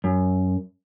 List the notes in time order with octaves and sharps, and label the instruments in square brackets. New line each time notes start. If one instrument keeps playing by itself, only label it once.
[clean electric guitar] F#2